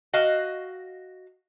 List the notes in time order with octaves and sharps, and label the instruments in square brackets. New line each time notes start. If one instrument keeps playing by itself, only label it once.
[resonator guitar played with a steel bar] F#4 D#5 F5